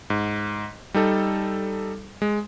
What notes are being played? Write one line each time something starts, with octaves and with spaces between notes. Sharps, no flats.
G#2
G3 D#4 A4
G#3